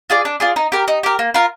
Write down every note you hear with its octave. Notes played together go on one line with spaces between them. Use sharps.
F4 G#4 D5
D4
F4 G#4 D5
D#4
G4 A#4
D#4
G4 A#4
A#3
F4 A#4